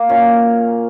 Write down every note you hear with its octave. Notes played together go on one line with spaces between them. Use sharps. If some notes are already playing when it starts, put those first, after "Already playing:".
Already playing: A#3 A#4
A#2 F#3 C#4